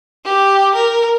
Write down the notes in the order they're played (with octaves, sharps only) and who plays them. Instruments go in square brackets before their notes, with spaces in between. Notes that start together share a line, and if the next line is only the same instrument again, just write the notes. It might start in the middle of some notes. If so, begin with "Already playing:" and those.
[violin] G4
A#4